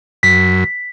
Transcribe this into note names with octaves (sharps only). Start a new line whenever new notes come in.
F#2 B6